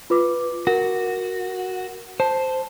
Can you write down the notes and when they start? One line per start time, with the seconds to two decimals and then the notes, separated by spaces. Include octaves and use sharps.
0.10 F4 B4 D6
0.67 F#4 A#4
2.20 C5 A5